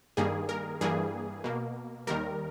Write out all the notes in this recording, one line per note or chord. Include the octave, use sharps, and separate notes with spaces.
G2 D#3 G3 A#3 G#4
A#4
G2 E3 G3 A#3 G#4
B2 A#3
D#2 D#3 G3 A#4